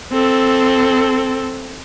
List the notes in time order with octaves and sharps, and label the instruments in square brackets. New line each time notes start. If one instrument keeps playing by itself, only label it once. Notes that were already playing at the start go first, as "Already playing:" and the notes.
[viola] C4 A4